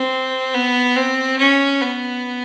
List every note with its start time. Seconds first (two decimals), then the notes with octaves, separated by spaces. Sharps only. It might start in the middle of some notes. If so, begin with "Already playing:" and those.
Already playing: C4
0.54 B3
0.96 C4
1.38 C#4
1.81 B3